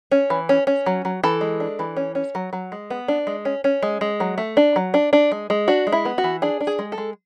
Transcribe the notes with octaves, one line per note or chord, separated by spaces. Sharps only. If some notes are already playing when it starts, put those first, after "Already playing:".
C#4
E3
C#4
C#4
F#3
F#3
E3 A4
G#3
D4
E3
C#4
C#4
F#3
F#3
G#3
B3
D4
G#3
C#4
C#4
G#3
G#3
F#3
A3
D4
F#3
D4
D4
G#3
G#3
D4 F#4
G#3
E4
B3
F#4
E3
D4 G#4
D4
G#4
G#3
A4
G#3